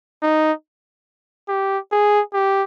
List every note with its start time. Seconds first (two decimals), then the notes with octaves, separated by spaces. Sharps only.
0.23 D#4
1.49 G4
1.92 G#4
2.34 G4